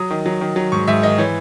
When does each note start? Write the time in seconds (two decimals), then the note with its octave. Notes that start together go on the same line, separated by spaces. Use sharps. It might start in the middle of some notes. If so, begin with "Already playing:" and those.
Already playing: F#3 D#6
0.11 D#3
0.26 F#3
0.41 D#3
0.56 F#3
0.72 G#2 C#6
0.87 G#2 E5
1.03 D#3 D#5
1.18 E3 C#5